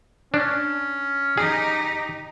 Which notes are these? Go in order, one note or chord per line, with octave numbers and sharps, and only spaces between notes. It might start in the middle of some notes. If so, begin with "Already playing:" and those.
C#4 D4
D#4 G4 G#4